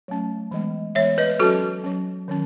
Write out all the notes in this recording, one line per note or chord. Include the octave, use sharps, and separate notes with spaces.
F#3 A3 C#4
E3 G#3 B3
E3 G#3 B3 C#5 E5
B4 D#5
F#3 C#4 F#4 A4
F#3 C#4
D#3 F#3 C#4